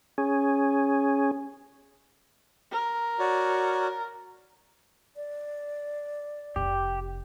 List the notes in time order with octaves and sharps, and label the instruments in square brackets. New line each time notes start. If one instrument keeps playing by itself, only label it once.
[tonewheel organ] C#4 G#4
[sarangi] A#4
[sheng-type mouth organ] F#4 C#5 D5
[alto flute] D5
[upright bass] F1 C3 [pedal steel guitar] G4